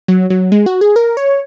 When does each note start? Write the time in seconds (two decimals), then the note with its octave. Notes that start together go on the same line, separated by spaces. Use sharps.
0.08 F#3
0.30 F#3
0.52 G#3
0.66 F#4
0.81 G#4
0.96 A#4
1.17 C#5